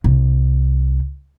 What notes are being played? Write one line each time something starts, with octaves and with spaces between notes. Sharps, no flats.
C2